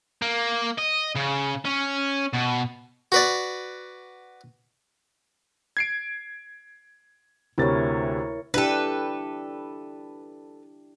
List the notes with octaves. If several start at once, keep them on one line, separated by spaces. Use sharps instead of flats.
A#3
D#5
C#3
C#4
B2
F#4 B4 D5
G#6 C7 D7
D2 C3 E4 A#4 C#5 A6
D4 E4 G4 A4 B4